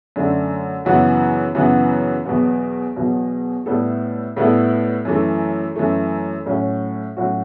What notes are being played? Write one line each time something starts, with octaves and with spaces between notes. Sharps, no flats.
F#2 D3 A3 D4
F#2 C#3 E3 B3 F#4
F#2 C#3 E3 B3 F#4
E2 B2 F#3 B3
E2 B2 F#3 B3
A2 G3 B3 E4 A4
A2 G3 B3 E4 A4
F#2 E3 A3
F#2 E3 A3
A2 F#3 C#4 F#4
A2 F#3 C#4 F#4